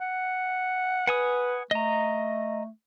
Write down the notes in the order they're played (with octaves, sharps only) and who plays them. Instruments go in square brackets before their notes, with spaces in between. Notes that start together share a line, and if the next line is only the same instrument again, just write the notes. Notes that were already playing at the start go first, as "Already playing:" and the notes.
[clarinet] F#5
[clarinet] B4 [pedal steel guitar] F#5 G#5 D#6
[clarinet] A3 [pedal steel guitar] D#5 A#5